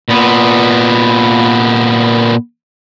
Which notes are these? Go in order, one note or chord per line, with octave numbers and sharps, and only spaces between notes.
A#2 B3